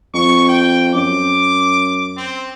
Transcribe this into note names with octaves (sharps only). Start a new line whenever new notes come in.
F2 C#6
G5
F#2 D6
C4